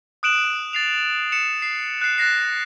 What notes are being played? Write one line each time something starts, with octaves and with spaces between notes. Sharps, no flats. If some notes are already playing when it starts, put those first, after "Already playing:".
D#6 F#6 D7 E7 F#7
A6 C7 F7
C#7 E7
C7
F#6 C7
F#6 A6 A#6 C7